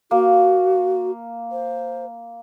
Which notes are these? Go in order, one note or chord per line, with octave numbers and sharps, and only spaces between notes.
A#3 F#4
C5